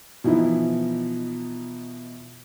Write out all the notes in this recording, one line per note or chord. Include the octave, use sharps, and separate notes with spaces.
B2 E3 F3 D#4 E4